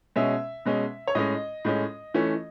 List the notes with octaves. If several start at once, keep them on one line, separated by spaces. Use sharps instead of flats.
B2 G#3 C#4 E5
B2 G#3 C#4
C#5
A2 G#3 C#4 D#5
A2 G#3 C#4
E3 A3 C#4